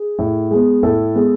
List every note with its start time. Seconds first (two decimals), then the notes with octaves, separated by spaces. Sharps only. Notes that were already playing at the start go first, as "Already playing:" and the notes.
Already playing: G#4
0.19 A2
0.51 G#3 B3
0.83 A2 A4
1.15 G#3 B3